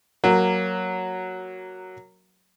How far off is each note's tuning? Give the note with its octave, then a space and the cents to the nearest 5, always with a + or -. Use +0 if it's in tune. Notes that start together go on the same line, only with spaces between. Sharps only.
F#3 +0 A#3 -5